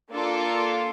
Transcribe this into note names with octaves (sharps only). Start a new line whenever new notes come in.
A#3 D4 F4 A4